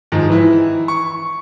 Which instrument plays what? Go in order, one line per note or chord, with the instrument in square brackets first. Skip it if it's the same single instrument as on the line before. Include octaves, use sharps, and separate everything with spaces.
[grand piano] G#2 D#3 F3
E3 E4
C#6